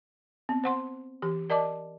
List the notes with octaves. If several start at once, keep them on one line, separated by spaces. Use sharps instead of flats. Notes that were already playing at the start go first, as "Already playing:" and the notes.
B3 C4
C5 F#5 C6
E3 G4
A#4 D5 D#5 A5 D6